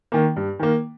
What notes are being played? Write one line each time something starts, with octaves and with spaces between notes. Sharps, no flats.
D#3 A#3
G2
D#3 A#3